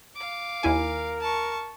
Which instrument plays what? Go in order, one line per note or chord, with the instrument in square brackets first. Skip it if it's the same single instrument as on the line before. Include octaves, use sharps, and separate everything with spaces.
[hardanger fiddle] F5 D6
[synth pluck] D#2 E4 G#5 [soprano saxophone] A#4
[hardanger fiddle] A5 C#6